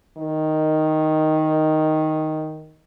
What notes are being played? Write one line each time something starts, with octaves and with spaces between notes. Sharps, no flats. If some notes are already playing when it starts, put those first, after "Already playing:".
D#3